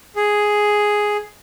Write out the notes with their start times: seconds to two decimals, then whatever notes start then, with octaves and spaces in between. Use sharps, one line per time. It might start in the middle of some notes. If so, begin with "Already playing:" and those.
0.16 G#4